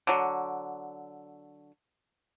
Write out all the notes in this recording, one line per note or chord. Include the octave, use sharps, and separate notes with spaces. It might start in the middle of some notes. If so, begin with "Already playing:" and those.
D3 F#3